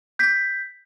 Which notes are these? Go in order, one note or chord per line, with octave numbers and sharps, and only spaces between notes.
G6 B6